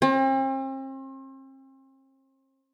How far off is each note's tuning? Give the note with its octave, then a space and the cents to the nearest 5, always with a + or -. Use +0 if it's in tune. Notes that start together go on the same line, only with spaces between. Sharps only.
C4 +40